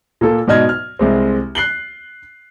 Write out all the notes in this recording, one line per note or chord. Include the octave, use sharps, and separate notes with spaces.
A#2 A#3 A4
G#2 B2 D5 D#5 F6 G#6
F6
C2 G#3 C4
F#6 C7 F#7 G7